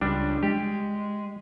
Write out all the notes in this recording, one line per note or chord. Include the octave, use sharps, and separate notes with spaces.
C#2 G3 D4
G#3 G4